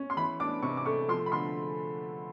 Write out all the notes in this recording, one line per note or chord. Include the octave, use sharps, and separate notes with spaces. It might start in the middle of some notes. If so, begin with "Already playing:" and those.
Already playing: C#4
C6
E3 B5
D4 D6
C3 C#6
D6
A3 C#6
F3 C6
B5
D3 C6